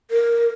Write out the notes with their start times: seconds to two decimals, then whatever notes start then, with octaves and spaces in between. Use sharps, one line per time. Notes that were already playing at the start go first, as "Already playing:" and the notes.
0.11 A#4